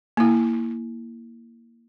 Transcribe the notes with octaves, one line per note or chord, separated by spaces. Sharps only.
A#3 E4